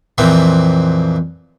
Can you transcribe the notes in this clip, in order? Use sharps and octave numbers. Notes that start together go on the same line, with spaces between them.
F2 A#2 E3 C4